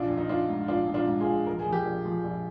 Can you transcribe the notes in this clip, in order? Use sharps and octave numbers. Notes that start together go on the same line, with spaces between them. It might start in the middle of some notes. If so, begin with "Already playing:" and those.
Already playing: A#1 D4 F4
A#1
D#4
A#1 D4 F4
G#2
A#1 D4 F4
A#1
D4 F4
G#2
F4 G#4
A#1
F3 A#4
G#4
F3
G4 A#4
A#1
F3
A#1